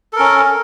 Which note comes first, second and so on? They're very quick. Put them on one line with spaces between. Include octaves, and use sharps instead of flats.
A4 A#4 C#4